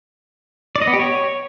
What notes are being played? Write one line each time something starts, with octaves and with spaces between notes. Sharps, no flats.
D5
D#5
B3
G4
C#5